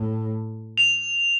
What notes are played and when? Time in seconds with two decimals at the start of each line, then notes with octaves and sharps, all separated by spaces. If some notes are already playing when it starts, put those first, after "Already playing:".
Already playing: A2
0.78 F7